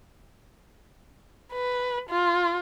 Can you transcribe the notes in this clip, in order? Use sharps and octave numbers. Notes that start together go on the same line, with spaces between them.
B4
F4